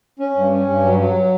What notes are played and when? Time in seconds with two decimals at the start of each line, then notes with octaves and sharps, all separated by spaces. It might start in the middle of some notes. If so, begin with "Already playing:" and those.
0.19 C#4
0.35 G2
0.52 C#4
0.67 G2
0.84 F#3
0.99 F#3